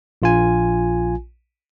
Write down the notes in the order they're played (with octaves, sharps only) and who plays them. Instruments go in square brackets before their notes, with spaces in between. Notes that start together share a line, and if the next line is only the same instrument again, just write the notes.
[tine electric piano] A#1 F4 G#5